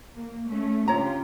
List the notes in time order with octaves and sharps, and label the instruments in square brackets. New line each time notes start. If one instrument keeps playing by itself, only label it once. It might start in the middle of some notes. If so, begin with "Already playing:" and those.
[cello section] A#3
A3 C#4
[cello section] C#3 F4 G4 [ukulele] D4 C#5 A#5